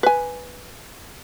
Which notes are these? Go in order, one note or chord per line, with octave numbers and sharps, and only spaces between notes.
B4 G#5